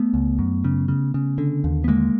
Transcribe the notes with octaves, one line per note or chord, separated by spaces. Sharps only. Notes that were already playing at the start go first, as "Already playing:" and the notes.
Already playing: A3 B3
C#2
F#2
C#3
C#3
C#3
D3
D#2
B3
D3 G#3 A#3